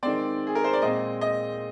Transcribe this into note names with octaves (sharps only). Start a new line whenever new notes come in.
D#3 G#3 C4 D5
G#4
A#4
C5
D5
A#2 G#3 C4 D#5
D#5